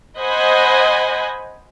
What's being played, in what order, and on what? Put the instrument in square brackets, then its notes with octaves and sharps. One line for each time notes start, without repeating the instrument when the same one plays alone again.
[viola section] C5 D#5 F#5 G#5 B5